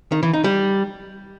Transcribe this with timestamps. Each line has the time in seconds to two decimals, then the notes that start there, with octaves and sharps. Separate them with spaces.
0.12 D#3
0.23 E3
0.33 D#4
0.44 G3